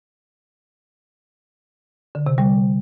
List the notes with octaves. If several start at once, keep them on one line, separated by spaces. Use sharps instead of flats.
D3
C3
G3